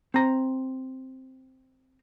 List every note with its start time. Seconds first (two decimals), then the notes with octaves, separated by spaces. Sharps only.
0.14 C4 A#5